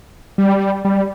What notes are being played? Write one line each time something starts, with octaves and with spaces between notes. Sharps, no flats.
G3
G3